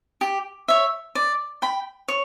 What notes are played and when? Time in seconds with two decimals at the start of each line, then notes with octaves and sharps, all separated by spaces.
0.21 G4
0.68 C#5 E5
1.15 D5
1.62 G5 B5
2.08 C#5